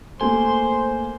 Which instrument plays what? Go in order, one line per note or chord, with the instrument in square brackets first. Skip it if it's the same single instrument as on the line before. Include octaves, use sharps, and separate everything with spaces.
[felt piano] A3 A#3 [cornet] C5 [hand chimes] G#5 [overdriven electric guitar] C6